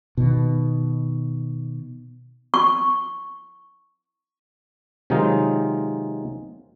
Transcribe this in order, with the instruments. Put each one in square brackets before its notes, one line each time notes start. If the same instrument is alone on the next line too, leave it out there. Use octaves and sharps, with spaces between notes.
[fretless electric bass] B2 D#3
[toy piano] C#6
[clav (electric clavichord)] C3 D#3 F#3 G#3 D#4 F4